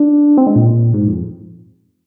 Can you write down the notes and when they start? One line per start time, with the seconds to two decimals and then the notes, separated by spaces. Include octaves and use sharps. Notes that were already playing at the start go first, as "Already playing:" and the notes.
Already playing: D4
0.37 C4
0.47 G#3
0.56 A#2
0.94 G#2
1.08 F2